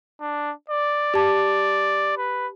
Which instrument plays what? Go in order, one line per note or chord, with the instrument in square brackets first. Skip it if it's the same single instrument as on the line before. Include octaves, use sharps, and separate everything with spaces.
[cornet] D4
D5
[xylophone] G4 A5
[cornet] B4